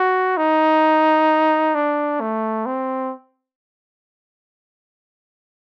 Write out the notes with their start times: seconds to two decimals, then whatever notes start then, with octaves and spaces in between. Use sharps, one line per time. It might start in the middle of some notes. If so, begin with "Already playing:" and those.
Already playing: F#4
0.37 D#4
1.75 D4
2.21 A3
2.66 C4